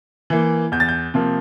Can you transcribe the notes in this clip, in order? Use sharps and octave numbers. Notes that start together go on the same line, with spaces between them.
E3 A#3
E2 G6
A6
G6
C3 F3 A#3